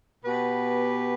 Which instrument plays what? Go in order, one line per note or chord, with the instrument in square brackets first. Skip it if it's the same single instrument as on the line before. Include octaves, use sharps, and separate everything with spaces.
[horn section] B2 B3 G4 B4